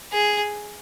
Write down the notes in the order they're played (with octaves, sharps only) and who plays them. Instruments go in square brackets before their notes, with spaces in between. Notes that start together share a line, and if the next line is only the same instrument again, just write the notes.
[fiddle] G#4